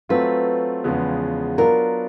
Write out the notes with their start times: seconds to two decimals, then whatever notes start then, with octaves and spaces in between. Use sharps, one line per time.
0.09 F#3 A3 C4 F4 B4
0.84 E2 C#3 F3 G#3 B3
1.58 F#3 B3 D4 F4 A#4